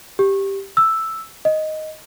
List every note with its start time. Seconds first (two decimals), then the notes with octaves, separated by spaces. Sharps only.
0.19 G4
0.77 E6
1.45 D#5